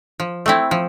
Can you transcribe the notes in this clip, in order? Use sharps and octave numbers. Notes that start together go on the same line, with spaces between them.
F3
A3 C4 E4
F3